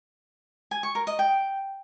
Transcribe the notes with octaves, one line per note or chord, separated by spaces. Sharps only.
G#5
C#6
A#4
D#5
G5